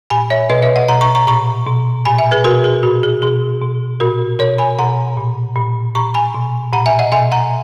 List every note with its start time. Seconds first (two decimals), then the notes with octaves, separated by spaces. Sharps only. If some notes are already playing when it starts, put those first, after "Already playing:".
0.10 A#2 G#5 B5
0.30 C#5 E5
0.50 B2 B4 D#5
0.62 C#5 E5
0.76 D#5 F#5
0.88 B2 F#5 A#5
1.01 A#5 C#6
1.15 A#5 C#6
1.27 A#2 A#5 C#6
1.67 B2
2.05 A#2 G#5 B5
2.18 E5 G#5
2.31 G#4 B4
2.44 B2 F#4 A#4
2.64 G#4
2.83 A#2 F#4
3.03 G#4
3.22 B2 G#4
3.61 B2
4.00 A#2 F#4 A#4
4.39 B2 A#4 C#5
4.58 G#5 B5
4.79 B2 F#5 A#5
5.17 A#2
5.56 A#2
5.95 A#2 A#5 C#6
6.14 G#5 B5
6.34 B2
6.73 A#2 F#5 A#5
6.86 E5 G#5
6.99 D#5 F#5
7.12 B2 E5 G#5
7.32 F#5 A#5